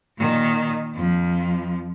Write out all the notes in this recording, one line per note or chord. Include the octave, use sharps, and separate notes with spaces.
A#2 D#3
F2 F3